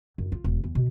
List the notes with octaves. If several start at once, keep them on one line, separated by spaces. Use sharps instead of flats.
F#2
F4
E1
E2
B2